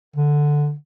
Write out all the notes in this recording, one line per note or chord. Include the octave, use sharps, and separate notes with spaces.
D3